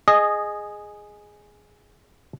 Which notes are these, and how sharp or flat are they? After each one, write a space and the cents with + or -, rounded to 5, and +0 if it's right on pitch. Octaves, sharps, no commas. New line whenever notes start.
G#4 +0 D#5 -15